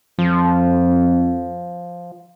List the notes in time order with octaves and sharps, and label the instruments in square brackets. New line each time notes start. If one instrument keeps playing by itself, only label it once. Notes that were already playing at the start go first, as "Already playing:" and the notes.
[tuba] F2 [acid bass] F3